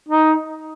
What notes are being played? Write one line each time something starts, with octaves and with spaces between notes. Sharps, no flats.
D#4